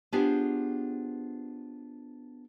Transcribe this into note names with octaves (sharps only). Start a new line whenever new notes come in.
B3 D4 F4 G4 G#4 C5